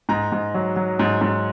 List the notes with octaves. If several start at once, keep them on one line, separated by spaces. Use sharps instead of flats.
G#2 A#5
G#2
F#3
F#3
G#2
G#2